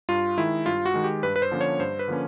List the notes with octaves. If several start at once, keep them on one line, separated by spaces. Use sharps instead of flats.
G2 F4
D#3 G#3 E4
G2 F4
F#4
D#3 G#3
G4
G2 B4
B4
C5
D3 F3 A#3 C#4
C#5
G2 C5
B4
D3 F3 A#3 C#4